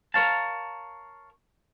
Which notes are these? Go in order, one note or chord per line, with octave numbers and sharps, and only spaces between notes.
A#4 B4 C#5 F5 A5